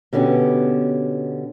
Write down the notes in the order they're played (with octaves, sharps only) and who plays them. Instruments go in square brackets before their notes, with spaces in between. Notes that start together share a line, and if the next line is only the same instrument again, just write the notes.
[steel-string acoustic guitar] B2 D3 B3 C#4 G4